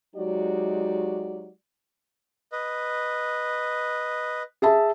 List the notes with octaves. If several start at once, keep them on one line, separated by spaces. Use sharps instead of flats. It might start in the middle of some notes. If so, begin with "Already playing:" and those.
F#3 G#3 D#4 F#4 G4 D5
B4 D#5
G#4 E5 A5